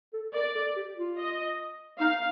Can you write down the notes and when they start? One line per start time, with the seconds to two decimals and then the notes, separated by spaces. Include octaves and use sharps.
0.13 A4
0.34 A#4 D5
0.55 A4
0.77 G4
0.97 F4
1.18 D#5
1.99 D#4 F5